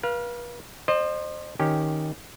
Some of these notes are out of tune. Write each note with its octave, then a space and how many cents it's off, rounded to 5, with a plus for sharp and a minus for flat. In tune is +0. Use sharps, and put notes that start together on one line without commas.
B4 -40 F5 -5
C5 +15 D#5 -40
D#3 +0 C#4 -15 G4 +0